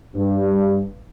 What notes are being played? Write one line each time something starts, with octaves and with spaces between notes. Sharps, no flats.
G2